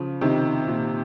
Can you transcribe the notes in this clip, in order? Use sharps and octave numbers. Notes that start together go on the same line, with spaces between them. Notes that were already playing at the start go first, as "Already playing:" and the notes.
Already playing: C#3 F3
C3 D#3
A#2